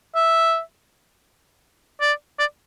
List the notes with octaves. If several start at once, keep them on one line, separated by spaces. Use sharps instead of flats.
E5
D5
D5